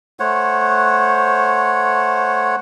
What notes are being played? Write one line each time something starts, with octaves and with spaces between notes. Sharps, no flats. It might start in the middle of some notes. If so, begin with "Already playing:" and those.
A3 C5 C#5 F#5